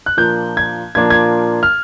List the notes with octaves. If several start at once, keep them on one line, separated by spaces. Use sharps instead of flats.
F#6
A#2 F3 A#3 D4 G6
G#6
A#2 F3 A#3 D4 G#6
G#6
F6